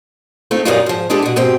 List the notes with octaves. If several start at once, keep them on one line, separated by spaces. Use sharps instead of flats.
A3 C4 D#4 F4
F#2 A#2 G3 B3 D#4 F4
G#2 F3
G#3 D4 E4 F4 G4 A4
B2 F#4
G#2 B2 C4 G4